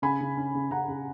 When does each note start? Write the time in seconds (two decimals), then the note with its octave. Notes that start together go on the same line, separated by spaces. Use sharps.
0.02 C#3 G#5 B5
0.20 C#3
0.37 C#4
0.55 C#3
0.71 C#3 F#5 A#5
0.88 C#3